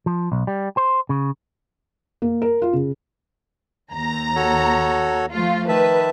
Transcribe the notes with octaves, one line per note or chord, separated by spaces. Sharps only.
F3
B1
G3
C5
C#3
A#3
A#4
F4
C#3
D#2 A#5
F#4 A4 C#5
F3 A3 F4
D#3 B4 E5 A5